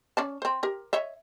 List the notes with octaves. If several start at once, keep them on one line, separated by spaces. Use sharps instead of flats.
C#4 D5 A5
C4 C5
G4 A#4
C#5 D#5 E5